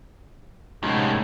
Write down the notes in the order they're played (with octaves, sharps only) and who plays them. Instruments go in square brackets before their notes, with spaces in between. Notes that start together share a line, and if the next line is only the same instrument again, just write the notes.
[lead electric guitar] C2 A2 [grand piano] G#3 C#4 D#4